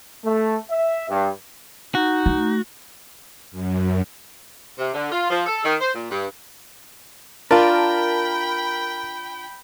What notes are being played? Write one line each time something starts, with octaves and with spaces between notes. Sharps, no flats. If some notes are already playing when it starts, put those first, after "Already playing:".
A3
E5
G2
D#4 F#4
A3
F#2
C3
D3
F4
F3
A4
D#3
C5
A#2
G2
D4 F4 A#4 G5 A5 B5